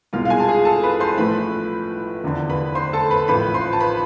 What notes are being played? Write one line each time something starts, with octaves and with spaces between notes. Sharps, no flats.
C2 B2 G#3 F4 F5
F5
G#4 G#5
A5
G#4 G#5
A4 A5
B4 B5
C5 C6
A1 A2 F3 A3 B4 B5
F1 E2 D3
B4 B5
C5 C6
A4 A5
B4 B5
A1 A2 F3 B4 B5
C5 C6
A5
B4 B5